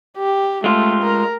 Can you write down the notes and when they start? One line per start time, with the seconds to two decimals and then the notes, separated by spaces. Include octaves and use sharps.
0.17 G4
0.64 G#3 A3 F4
1.03 A#4